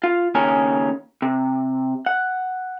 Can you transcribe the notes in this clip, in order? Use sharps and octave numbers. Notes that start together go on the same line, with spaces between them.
F4
D#2 C#3 C#4 A#4 G#5
C3
F#5